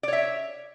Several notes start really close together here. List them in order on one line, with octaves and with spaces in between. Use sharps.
D5 C#5 E5